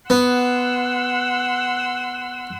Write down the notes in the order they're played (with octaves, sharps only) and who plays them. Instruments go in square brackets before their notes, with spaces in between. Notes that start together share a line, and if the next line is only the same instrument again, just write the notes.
[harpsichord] B3 [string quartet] F#5 C6 E6